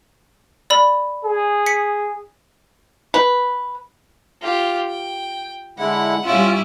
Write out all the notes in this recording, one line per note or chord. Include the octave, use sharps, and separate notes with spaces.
D5 B5
G#4
B6 C#7
B4
F4 G4
G5
D3 G#3 E4 F#5
G3 C#4 E4 F4